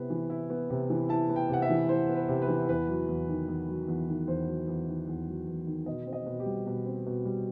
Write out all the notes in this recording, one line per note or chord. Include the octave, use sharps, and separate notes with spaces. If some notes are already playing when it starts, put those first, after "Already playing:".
Already playing: C3 B3 E4
E3
E4
B3
C3
E3
E4 A5
B3
G5
C3 F#5
E5
E3
E4 C5
B3
B4
C3
B4
E3
E2 B4
F#3
E2
D#3
E2
F#3
E2
D#3
E2 C5
F#3
E2
D#3
E2
F#3
E2
D#3
B2 D#5
C4
D#5
B2
G4
G3
B2
C4
B2
G3